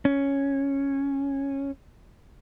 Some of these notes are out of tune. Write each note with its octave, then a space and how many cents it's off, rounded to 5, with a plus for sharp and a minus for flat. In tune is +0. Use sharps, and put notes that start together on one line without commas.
C#4 -5